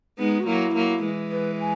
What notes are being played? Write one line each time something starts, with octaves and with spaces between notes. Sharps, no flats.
G#3 B3 D#4
F#4
F#3 A#3 E4
F#3 A#3
E3 G#3
B4
G#5